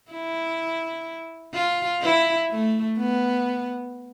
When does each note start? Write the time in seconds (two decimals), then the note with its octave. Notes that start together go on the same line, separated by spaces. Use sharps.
0.12 E4
1.54 F4
2.02 E4
2.50 A3
2.98 B3